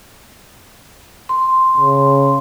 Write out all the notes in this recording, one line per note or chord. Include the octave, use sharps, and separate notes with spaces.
C6
C#3